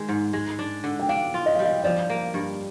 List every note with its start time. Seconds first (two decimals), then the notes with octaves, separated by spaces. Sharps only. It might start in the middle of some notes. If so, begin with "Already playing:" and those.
Already playing: D#3 G#3
0.09 G#2
0.33 G#3
0.59 D4
0.84 D3
0.99 G5
1.09 D4 F5
1.34 F4
1.46 D#5
1.55 F5
1.59 G3
1.64 D#5
1.84 F3 D5
2.10 A#3
2.34 G2